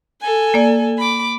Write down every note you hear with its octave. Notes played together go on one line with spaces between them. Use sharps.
A4 G#5
A#3 D5
B5 D6